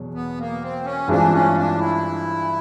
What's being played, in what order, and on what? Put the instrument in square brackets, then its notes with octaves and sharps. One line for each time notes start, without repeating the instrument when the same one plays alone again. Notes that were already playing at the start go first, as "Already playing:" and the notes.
Already playing: [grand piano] E2 B2 F#3
[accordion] B3
A#3
C4
C#4
[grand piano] G2 E3 G#3 C4 F4 [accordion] D4
[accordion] C#4
D4
E4